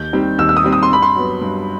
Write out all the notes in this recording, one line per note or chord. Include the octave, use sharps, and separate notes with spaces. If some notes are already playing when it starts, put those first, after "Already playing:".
Already playing: D#2 G6
D#3 G3 C4
D#2 E6
E6
D#6
D#3 G3 C4
D#6
C6
G2 B5
C6
F#3 B3
G2